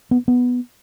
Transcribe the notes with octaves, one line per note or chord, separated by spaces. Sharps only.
B3
B3